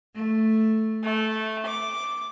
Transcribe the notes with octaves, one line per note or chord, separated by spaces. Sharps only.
A3
A3
D6